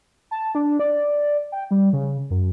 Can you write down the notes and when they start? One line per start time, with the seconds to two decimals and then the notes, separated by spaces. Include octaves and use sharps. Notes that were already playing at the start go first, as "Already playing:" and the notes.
0.31 A5
0.55 D4
0.79 D5
1.52 G5
1.71 G3
1.93 C#3
2.30 F#2